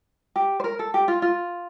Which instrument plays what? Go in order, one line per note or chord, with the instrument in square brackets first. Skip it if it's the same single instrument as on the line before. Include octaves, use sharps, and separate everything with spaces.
[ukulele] G4
C5
A#4
A4
G4
F4
F4